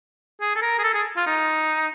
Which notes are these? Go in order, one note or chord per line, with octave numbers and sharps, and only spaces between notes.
G#4
A4
A#4
G#4
A4
G#4
F4
D#4